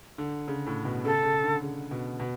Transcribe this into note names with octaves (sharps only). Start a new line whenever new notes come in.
D3
C#3
A2
B2
C#3 A4
C#3
D3
C#3
B2
B2